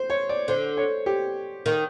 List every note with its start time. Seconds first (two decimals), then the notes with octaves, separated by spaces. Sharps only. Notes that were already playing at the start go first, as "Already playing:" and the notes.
Already playing: C5
0.10 C#5
0.29 D5
0.48 D3 C5
0.77 C#5
1.06 G4
1.66 D#3